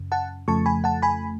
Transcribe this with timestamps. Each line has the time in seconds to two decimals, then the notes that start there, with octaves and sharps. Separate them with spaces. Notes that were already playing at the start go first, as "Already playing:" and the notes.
Already playing: F#2 C#3
0.12 F#5 A5
0.48 F2 C#3 F3 A3 A5 C#6
0.66 G#5 B5
0.84 F#5 A5
1.02 G#5 B5